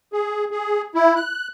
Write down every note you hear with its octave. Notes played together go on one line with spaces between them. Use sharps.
G#4
G#4
E4
F#6